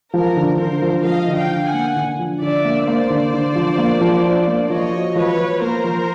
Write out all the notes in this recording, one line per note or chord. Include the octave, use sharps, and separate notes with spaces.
F3 A#4
D3
D3 A#4 C5
F3
F3 D#5 F5
D3
F5 G5
D3
F#5 G#5
A#3
D3
F3
D3 D5 E5
A#3
A#3 C5 D5
D3
D3
F3
A#3
F3
D4
A#3
F3 C#5 D#5
F#4
F3 B4 C#5
F3
A#3 A#4 C5
F3